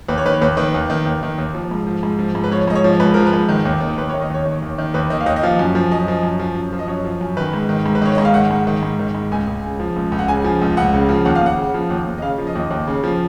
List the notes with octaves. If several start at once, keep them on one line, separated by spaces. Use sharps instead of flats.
D#2 B4
C#5
D#3 B4
C#5
D#2 B4
D#3 B4
D#2
D#3
D#2
D#3
D#2
F3
G#2
F3
G#2
F3
G#2
B4
F3 C#5
G#2 D#5
C#5
F3
G#2 B4
F3 A#4
B4
G#2
D#3
D#2
D#3
D#2 B4
C#5
D#3
D#5
D#2 C#5
D#3
D#2
D#3
D#2 B4
D#3 D#5
F5
D#2 D#5
D#5
F3 F5
F#2
F3
F#2 D#5
F3
F#2
F3
F#2
F3
D#5
F#2 C#5
F3
F#2
D#3 B4
G#2
D#3
G#2
B4
D#3 C#5
G#2 D#5
F5
D#3 F#5
G#2
D#3
G#2
D#3
G#2
C#2 G#5
C#2
C#3
F3
C#2
C#2
F#5
C#3 G#5
F3
C#2
C#2 F#5
C#3
F3
D#2 F#5
F5
D#2 F#5
C#3
F3
D#2
D#2
D#5
C#3 F5
F3
D#5
D#2
D#2
C#3
F3